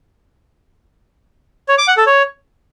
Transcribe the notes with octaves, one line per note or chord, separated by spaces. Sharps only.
C#5
D6
F#5
A4
C#5